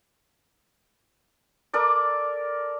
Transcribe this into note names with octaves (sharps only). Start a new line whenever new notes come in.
A4 A#4 D5 D6